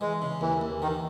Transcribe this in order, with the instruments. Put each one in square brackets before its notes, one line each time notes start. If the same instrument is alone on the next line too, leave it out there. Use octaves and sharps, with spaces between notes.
[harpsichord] E3 [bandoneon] G#3
[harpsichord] C#3
[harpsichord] D#2 [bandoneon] E3
[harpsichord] D#2
[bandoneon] D#3 [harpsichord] E3